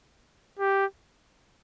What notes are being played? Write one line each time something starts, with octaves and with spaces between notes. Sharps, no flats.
G4